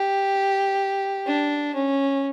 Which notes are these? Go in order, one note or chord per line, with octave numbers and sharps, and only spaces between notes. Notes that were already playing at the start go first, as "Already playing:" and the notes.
Already playing: G4
D4
C#4